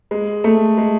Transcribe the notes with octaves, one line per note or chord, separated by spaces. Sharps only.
G#3
A3
G#3